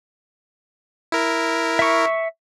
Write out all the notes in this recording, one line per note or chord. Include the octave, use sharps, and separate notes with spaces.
E4 A#4
E5 C#6